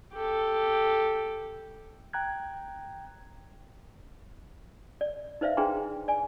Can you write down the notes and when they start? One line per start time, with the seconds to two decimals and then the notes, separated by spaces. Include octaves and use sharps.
0.14 G4 A4
2.13 G5 A#5 F#6 G#6
5.01 D5
5.41 D#4 B4 C5 D5 E5 F5
5.57 D4 G#4 B4 G5 A#5 C6
6.08 D5 G#5